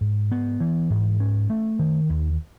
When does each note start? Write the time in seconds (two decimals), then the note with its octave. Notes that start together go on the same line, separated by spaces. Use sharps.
0.01 G#2
0.31 B3
0.61 E3
0.90 G#2
1.20 C#4
1.50 A3
1.79 D#3
2.10 D#2